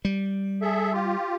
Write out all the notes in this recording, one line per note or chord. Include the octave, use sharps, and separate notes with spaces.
G3
G#4 A4 E5
F4 G4